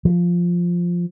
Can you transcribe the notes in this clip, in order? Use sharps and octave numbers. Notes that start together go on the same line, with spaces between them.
F3